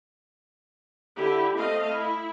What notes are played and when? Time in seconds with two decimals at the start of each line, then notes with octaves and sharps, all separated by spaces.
1.16 D3 E4 G4
1.56 A3 C4 D#5 F5
1.90 E4